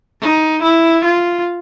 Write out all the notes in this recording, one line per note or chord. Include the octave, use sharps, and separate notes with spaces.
D#4
E4
F4